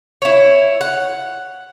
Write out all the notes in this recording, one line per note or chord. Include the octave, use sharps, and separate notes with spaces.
E4 C#5
F#5